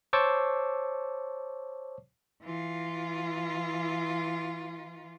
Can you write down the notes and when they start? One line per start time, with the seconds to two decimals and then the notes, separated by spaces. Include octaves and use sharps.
0.13 C5 C#5 A5 C#6 D6 E6
2.43 E3 F4